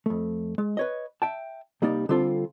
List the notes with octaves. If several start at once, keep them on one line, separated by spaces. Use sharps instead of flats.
F2 A3
G#3
B4 C#5 D#5
E5 G5 A5
C2 G3 A#3 D#4 D5
D3 G3 C4 F4 A4